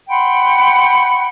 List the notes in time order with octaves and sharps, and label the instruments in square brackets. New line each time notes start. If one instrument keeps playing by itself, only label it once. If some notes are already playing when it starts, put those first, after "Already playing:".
[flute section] F#5 G5 B5 C6